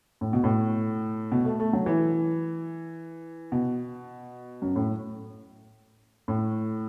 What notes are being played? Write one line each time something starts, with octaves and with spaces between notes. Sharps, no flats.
A2
B2
A2
B2
A3
A3
F#3
E3
B2
F#2
A2
A2